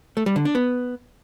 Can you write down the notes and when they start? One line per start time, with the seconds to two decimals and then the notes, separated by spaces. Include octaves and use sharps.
0.17 A3
0.26 G3
0.36 D3
0.45 D4
0.55 B3